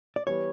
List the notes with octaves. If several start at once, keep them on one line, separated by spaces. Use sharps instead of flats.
D5
E3 G3 B3 C#5